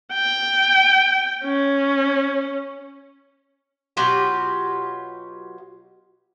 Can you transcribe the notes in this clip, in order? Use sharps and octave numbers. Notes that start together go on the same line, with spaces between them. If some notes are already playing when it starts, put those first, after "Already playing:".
G5
C#4
B2 F#3 F4 G4